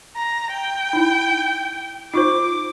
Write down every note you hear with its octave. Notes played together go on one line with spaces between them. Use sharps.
A#5
G5
D#4 E4
D#4 F4 C5 D6